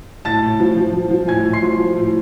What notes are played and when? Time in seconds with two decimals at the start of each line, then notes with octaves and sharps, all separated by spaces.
0.25 A2 A5 A6
0.42 A2
0.60 F3
0.77 F3
0.93 F3
1.11 F3
1.28 A2 G#5 G#6
1.45 A2
1.53 C6 C7
1.62 F3
1.80 F3
1.97 A2